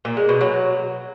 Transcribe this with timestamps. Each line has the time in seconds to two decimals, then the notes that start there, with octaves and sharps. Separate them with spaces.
0.05 A#2
0.17 G#3
0.29 B2
0.41 F#3